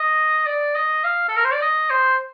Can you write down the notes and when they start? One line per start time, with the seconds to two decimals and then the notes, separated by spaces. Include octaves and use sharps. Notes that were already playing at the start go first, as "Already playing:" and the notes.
Already playing: D#5
0.46 D5
0.75 D#5
1.04 F5
1.28 A4
1.36 A#4
1.45 C5
1.53 D5
1.62 D#5
1.90 C5